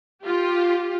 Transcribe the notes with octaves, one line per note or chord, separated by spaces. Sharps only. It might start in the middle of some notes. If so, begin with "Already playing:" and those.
F4 G4